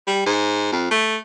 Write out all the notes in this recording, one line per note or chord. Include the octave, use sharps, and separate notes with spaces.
G3
G#2
F2
A3